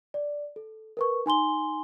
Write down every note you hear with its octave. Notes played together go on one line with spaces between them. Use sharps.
D5
A4
A#4 B4 C#6
D#4 G#5 C6 G7